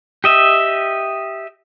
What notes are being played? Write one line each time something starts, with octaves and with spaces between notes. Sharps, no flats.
G4 D#5 E5